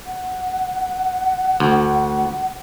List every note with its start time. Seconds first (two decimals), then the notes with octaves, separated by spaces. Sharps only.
0.06 F#5
1.60 D2